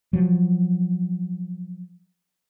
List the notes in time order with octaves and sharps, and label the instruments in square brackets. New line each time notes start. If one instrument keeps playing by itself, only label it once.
[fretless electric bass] F3 F#3